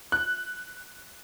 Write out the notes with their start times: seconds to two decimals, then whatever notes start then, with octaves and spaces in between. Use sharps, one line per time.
0.12 F#6